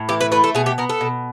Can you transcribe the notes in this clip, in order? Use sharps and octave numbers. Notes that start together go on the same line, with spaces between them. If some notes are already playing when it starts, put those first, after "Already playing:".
Already playing: A2
E3 G4
B4
A3 B4
A4
B2 G#4
G4
B3 A#4
A4
B2